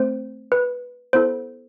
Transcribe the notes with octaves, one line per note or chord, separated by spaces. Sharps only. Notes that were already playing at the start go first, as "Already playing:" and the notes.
Already playing: A3 C4 C5
B4
B3 E4 A4 C5